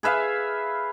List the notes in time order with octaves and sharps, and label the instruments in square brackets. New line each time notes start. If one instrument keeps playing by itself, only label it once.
[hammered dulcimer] G#4 B4 E5 F5